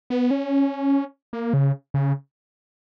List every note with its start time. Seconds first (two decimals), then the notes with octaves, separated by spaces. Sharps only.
0.10 B3
0.31 C#4
1.33 A#3
1.53 C#3
1.94 C#3